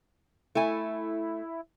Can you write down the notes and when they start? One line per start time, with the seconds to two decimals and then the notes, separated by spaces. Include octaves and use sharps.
0.55 A3 E4 G#5